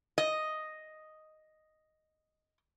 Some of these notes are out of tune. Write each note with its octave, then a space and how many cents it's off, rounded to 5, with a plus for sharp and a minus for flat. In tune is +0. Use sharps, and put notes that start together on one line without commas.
D#5 +0